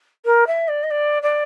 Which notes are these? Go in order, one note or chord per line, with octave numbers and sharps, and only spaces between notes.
A#4
E5
D5
D#5
D5
D5